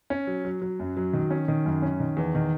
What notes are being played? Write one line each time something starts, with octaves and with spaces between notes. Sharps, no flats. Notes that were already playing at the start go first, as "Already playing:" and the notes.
C#4
F#3
F#3
F#3
F#2
F#3
D#3
C#4
D#3
F#2
C#4
D#3
E2
D#3